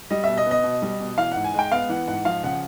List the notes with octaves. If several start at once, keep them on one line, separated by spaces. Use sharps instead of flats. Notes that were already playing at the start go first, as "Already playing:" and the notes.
G3 D#5
B2 E5
D#5
B3
D#5
B2
G3
B2
E3 F5
G#2 F#5
G#5
G#3 G5
B3 F5
E3 F#5
G#2 F#5
F3 F5
C#3 F#5